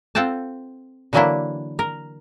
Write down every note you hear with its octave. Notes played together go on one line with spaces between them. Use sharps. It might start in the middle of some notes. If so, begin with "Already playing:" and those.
C4 F4 A4 F#5 G5 A5
D3 E3 F#3 A#3 D4 E4
A#4